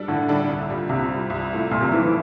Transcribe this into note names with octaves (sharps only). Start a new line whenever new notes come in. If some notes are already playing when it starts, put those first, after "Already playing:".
Already playing: G3 D4 A4
A2 D3
G3 D4 A4
C2
A#2 G3
C2 C3
A#2 G3
C2
A#2 A3 E4
C2 A#2
C3
A#2 E3 A3 E4
E3